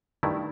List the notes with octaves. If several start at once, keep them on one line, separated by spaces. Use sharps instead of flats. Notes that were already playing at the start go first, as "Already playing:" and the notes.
G2 D#3 A3 E4